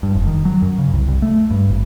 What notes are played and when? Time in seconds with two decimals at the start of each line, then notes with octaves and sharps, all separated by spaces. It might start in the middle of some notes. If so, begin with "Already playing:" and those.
0.03 G2
0.15 F1
0.26 D#3
0.45 F#3
0.62 F#2
0.78 C#3
0.93 C2
1.08 C2
1.22 A3
1.50 G2
1.70 G#1